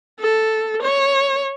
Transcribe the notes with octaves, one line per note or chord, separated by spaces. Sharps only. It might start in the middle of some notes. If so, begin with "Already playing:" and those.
A4
C#5